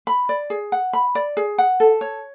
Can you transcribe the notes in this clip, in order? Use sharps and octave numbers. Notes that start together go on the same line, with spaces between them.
B5
D5
G#4
F#5
B5
D5
G#4
F#5
A4
C#5